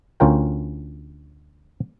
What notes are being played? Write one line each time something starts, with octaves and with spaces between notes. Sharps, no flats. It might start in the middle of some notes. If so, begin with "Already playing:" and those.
D2 C#4 F4 A#4 G5